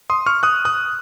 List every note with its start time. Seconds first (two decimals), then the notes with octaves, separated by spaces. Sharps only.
0.10 C6 D#6
0.26 C#6 F6
0.43 D#6 F#6
0.65 D#6 F#6